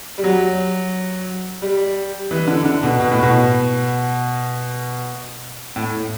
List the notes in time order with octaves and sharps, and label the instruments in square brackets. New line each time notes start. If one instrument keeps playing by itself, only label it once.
[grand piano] G3
F#3
G3
E3
D3
D3
B2
B2
A2
B2
A2